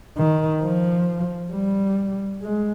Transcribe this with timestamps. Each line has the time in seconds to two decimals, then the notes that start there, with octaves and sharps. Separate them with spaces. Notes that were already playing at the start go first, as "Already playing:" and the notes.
0.17 D#3
0.62 F3
1.53 G3
2.42 G#3